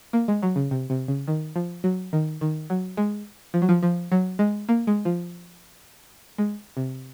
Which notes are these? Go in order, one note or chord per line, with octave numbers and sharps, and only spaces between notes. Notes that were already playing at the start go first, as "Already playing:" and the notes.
A#3
G#3
F#3
C#3
C3
C3
C#3
D#3
F3
F#3
D#3
D#3
F#3
G#3
F3
F#3
F3
F3
F#3
G#3
A#3
G#3
F3
G#3
C3